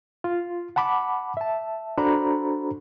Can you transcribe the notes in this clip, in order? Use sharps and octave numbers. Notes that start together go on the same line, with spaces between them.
F4
F#5 A5 B5 D6
E5 A5
D4 F#4 A4 C5 A#5 B5